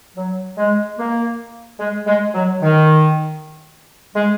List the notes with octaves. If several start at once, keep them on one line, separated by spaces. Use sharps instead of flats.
F#3
G#3
A#3
G#3
G#3
F#3
D#3
G#3